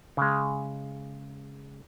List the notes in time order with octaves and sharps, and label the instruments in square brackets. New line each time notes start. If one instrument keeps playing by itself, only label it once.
[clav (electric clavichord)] C#3 G#3